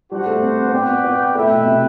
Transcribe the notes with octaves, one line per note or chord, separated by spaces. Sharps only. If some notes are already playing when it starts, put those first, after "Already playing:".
G3 D4 F#4 C5 F#5
A3
C4
B3
C4 F#4 B4 D5 G5
B3
B3
A3 E4 B4 E5 G5
B2
B2
C3